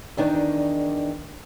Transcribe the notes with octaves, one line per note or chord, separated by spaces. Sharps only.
E2 D#3 D4 D#4